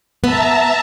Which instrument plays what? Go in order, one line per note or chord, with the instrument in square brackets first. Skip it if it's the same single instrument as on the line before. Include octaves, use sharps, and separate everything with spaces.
[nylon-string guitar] B3 [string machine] E5 A5 A#5